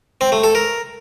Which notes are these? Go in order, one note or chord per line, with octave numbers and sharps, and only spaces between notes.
C4
A3
A4
A#4